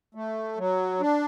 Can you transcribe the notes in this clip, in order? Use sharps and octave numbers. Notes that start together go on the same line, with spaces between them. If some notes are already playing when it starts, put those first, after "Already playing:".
A3
F#3
D4